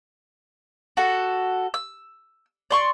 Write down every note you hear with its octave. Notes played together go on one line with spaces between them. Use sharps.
F#4 A4
E6
D5 C6 C#6